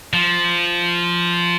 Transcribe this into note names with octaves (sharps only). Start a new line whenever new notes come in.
F3